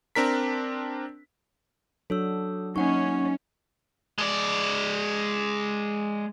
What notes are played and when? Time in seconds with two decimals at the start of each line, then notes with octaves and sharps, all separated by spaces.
0.15 C4 D4 A#4 B6
2.10 F#3 D4 F#4 A4 C#5 E6
2.76 F#3 A#3 C#4 D#4 F#5 C#6
4.19 G#3 D5